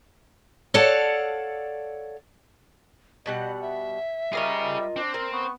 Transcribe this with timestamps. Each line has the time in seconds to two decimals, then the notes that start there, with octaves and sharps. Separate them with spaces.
0.74 A4 C#5 D5 F5 F#5 A5
3.26 B2 G3 D#5 F#5
3.61 E5
4.33 G3 F4 G#4 A#4 C#5 D#5
4.96 C4 D4
5.14 A#3 A#4
5.32 B3 C#6